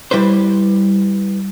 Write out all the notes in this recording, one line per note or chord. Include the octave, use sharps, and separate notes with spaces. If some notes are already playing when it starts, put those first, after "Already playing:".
G3 E4 B4 C5